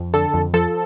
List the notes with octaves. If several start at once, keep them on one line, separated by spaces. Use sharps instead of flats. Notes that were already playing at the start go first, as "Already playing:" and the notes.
Already playing: F2
D3 A4
F2
F3 A4